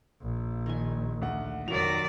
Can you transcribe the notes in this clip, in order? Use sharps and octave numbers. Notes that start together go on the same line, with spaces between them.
A#1
D#3 G#5
D2 F#5
F1 D#3 F#3 D5 F7